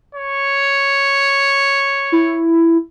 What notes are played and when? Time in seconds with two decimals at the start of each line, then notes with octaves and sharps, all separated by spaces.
0.15 C#5
2.12 E4